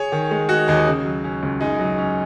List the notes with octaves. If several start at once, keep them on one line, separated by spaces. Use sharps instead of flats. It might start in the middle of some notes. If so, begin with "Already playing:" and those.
Already playing: G#4 C#5
D#3
G#3
D#4 F#4
D#2 D#4 G#4
C#3
F#3
C#4
C#2
F#2 D#4 G#4
F#3
C#4